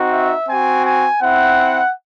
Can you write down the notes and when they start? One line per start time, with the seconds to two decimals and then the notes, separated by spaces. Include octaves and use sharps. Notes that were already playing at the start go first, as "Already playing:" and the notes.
Already playing: C4 D#4 F#4
0.12 E5
0.48 C4 F#4 G#5
0.85 G#5
1.22 C4 E4 F#5